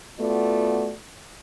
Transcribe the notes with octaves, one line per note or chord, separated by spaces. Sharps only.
A3 B3 F4 F#4 D5